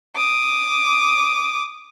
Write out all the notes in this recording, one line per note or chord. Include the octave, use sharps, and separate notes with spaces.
D6 D#6